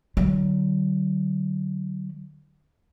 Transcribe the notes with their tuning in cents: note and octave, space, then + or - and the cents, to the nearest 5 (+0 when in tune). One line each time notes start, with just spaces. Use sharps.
D3 +25 F#3 +30